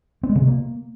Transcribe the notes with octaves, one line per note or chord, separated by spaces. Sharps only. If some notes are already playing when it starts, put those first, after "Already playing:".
C4
G#3
C#3
C3
A#3